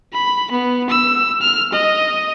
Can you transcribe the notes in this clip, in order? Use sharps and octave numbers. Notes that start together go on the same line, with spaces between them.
B5
B3
E6
F6
D#5